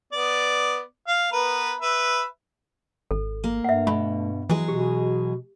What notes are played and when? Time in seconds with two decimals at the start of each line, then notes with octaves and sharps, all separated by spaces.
0.13 B3 D5
1.08 F5
1.32 B3 A#4 B4
1.81 B4 E5
3.11 G#1 A4
3.44 A#3
3.64 G2 E5 F#5
3.87 B2 A3 B5
4.49 E3 F#3 G#3 G#4
4.68 B2 G4